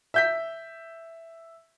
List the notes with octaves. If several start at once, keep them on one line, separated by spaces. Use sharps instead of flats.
E5 G6 B6